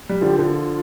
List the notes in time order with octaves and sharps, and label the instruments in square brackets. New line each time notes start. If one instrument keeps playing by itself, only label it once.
[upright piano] G3
[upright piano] D3 F3 [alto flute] G4
[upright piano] D3 F3 [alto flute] F4